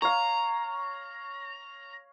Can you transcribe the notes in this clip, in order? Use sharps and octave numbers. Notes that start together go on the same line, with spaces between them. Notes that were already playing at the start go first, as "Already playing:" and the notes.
C#5 F5 A#5